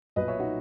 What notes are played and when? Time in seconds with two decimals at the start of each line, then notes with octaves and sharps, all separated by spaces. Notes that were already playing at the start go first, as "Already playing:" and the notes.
0.16 B1 A#2 B4 D#5
0.28 C#5 E5
0.39 D#4 F#4